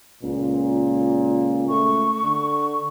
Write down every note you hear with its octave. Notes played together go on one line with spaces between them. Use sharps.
C#2 A#2
A3 C#6
D3